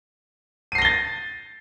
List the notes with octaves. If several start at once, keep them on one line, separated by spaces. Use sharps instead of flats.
A6 A#6 C7 D#7 G7